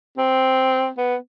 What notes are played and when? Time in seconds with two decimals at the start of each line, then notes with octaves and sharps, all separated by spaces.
0.18 C4
0.98 B3